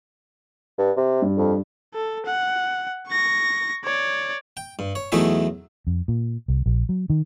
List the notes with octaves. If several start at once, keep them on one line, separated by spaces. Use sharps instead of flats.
G2
C3
G2
F2
A4
F#5
C#6 A#6
C#5 D5
G5
G2
C#5
E2 F#3 A3 D#4 E5 G#5
F2
A#2
C2
A#1
F#3
D#3